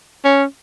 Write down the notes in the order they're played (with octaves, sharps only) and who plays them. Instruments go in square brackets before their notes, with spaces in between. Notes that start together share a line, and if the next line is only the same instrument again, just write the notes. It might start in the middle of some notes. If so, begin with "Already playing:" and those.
[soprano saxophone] C#4